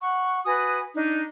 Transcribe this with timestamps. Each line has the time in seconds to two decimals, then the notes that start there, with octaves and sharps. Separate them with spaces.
0.01 F#5 C#6
0.44 F#4 B4 G#5 D#6
0.94 D4 D#4